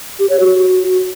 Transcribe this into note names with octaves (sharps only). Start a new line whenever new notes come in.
G4
C#5
F#4